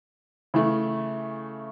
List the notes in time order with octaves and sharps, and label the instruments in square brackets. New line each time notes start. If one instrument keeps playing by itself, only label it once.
[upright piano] C#3 E3 A3